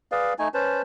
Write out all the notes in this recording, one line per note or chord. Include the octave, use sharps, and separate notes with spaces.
G#4 B4 D5 F5
A3 D#4 G#5
C#4 B4 C5 A5